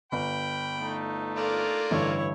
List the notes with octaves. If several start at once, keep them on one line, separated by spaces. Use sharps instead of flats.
G1 G5 B5
A3 D#4
A#3 D4 F4 A4
A1 G2 D3 E4 C#5